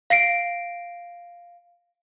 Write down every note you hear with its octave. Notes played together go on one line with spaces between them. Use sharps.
F5 A#6 C7 D7